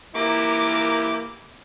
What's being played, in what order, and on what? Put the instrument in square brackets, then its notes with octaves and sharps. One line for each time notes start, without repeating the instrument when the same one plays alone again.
[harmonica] E3 E4 G4 [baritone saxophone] A#3 [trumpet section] F4 A#4 A#5 [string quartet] D6